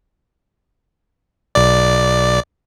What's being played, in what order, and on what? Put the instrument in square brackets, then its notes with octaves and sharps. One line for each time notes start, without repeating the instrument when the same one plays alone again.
[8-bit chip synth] B1 D5